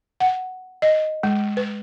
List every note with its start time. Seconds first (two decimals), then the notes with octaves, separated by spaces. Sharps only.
0.20 F#5
0.82 D#5
1.23 G#3
1.57 B4